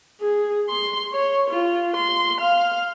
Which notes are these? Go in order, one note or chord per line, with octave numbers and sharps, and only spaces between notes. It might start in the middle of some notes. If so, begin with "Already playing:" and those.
G#4
C6
C#5
F4
C6
F5